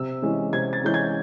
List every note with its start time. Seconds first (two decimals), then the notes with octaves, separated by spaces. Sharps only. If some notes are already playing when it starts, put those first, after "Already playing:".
Already playing: C3 E6
0.22 E3 G#3 C#4
0.53 C3 G#6
0.73 A6
0.84 E3 G#3 C#4 G6
0.94 G#6